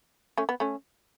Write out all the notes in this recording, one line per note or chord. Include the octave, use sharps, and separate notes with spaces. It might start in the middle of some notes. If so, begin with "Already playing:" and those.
A3 C#4
B3
A3 C#4